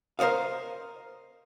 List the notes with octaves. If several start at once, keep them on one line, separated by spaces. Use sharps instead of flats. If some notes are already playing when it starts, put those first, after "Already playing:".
A#4 C5 C#5 D#5 F5